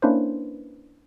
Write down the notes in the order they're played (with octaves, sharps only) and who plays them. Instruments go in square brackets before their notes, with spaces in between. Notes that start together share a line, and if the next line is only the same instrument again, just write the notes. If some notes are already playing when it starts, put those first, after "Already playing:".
[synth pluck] A#3 C#4 D4 E4 B4 C5